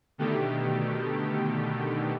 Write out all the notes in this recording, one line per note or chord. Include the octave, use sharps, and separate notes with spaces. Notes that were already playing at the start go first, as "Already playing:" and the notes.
B2 D3 D#3 A3 G4